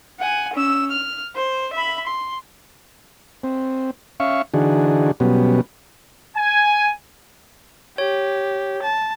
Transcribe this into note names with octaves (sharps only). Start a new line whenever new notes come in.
F#5 G#5
C#4 E6
F6
C5
E5 B5
C6
C4
C#4 E5 F5 C#6
D3 E3 D4 D#4 F#4 G#4
B2 F#3 G3 B3 C#4
G#5
G4 C#5
A5